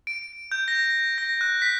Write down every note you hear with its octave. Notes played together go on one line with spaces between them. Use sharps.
D7
G6
A#6
A#6
F#6
B6